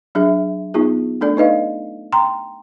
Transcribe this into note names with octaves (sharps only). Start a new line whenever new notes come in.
F#3 D4 G#4 E5
B3 D#4 F4 G#4
A3 D4 A4 D5
D#4 B4 D#5 F5
G5 A#5 C6